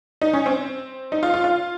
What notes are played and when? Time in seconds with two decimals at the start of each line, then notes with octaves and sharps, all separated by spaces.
0.21 D#4
0.33 C#4
0.46 C4
1.12 D#4
1.23 F4
1.34 F4
1.44 F4